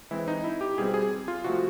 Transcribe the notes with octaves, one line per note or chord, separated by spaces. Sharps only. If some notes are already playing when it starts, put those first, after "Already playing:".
E3 G#3 C4 E4
D#4
E4
G4
B2 G3 C4 G#4
G#4
F4
C3 F3 A3 F#4